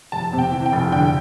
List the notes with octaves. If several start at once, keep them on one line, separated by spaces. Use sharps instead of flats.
F1 A5
C3
G5
E3
G5
F1
D3 G5